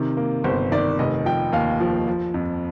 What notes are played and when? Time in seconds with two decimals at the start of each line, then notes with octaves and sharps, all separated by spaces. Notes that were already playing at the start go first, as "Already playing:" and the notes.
Already playing: C3 D#3
0.17 A#3
0.44 G1 C5
0.71 D#3 D5
0.99 F1 D#5
1.25 F3 G5
1.52 D#2 F5
1.80 F3
2.07 F3
2.34 F2